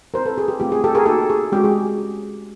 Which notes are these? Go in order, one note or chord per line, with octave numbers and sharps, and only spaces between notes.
C4 E4 G4 A#4 C5
A4 B4
G#4
G4
A3 C4 F4 G4
G#4
G4 A4
G#4 A#4
A#3 D#4 F#4 G4 A4
G#4
G#3 C#4 F#4 G4
G#4